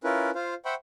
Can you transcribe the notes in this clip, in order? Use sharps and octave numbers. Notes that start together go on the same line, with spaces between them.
C#4 E4 F4 A#4 B4
F4 C5 F5
C5 E5 F#5 G5 B5 C#6